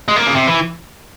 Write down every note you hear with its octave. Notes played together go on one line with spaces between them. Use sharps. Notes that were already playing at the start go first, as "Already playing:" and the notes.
G#3
A#3
C#3
C3
E3